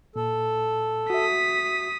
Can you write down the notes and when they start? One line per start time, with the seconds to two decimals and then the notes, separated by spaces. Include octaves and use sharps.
0.16 A#2 A4
1.10 F#4 E5 D#6 B6